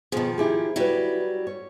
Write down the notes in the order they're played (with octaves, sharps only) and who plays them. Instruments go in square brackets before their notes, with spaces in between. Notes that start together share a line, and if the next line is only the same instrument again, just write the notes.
[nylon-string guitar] B2 G#4 [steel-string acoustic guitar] D#3 F3
[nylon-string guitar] E4 G4 G#4
[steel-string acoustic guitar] F#3 G3 [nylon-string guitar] E4 B4
[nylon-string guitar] C#5